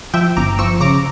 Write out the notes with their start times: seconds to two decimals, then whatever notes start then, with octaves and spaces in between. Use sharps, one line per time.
0.14 F3 E5 G5
0.36 G1 A#5 D6
0.59 F3 C#6 E6
0.80 C#3 A#5 D6